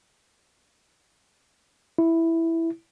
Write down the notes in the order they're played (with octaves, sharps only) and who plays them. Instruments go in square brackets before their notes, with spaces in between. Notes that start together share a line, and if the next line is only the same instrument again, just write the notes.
[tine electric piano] E4